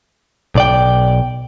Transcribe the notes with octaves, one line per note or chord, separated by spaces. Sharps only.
B1 D5 G5